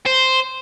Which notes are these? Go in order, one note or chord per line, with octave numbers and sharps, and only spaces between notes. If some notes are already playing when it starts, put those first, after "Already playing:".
C5